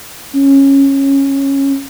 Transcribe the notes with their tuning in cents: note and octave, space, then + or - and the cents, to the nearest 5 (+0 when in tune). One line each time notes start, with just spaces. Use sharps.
C#4 -15